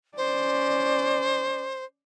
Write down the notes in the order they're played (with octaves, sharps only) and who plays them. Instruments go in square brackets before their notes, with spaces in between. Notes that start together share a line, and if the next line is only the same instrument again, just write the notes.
[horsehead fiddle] C#4 D5 [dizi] C5